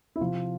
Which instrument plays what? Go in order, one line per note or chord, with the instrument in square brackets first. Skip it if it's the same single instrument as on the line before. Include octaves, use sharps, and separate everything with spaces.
[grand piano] E4
C3 F3 F4